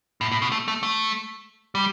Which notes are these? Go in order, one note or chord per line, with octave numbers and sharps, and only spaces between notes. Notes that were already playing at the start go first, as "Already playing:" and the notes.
A2
A2
B2
A3
A3
A3
G3